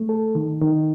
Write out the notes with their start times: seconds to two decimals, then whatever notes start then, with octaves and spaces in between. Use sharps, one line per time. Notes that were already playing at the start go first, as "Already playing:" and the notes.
Already playing: A3
0.09 A4
0.35 D#3
0.61 D#3